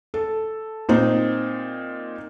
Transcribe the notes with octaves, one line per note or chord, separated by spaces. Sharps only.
A4
A#2 C4 D#4